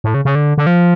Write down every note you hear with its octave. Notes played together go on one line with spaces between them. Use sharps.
A2
C#3
C#3
D3
D3
F3